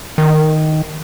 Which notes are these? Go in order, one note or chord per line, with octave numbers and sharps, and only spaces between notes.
D#3